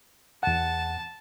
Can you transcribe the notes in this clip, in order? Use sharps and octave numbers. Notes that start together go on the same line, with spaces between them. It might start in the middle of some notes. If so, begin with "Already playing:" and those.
E2 F#5 A5